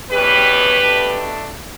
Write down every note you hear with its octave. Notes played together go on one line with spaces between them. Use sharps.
E2 B2 G3 C#4 G4 B4
B2 A3 D4